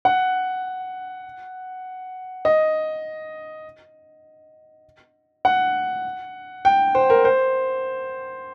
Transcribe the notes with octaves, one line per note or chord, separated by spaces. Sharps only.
F#5
D#5
F#5
G5
C5
A#4
C5